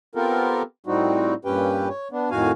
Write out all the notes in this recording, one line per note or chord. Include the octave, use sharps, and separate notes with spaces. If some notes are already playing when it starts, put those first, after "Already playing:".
B3 C4 F4 G4 A4 A#4
A2 G3 C4 D#4 F#4
G2 A#2 C#4 G4 B4 G5
C#5
B3 D4
F2 A2 D#3 F#4 F5 G#5